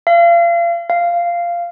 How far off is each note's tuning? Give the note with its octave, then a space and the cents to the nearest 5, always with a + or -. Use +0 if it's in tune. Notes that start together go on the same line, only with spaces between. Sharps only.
F5 -35
F5 -10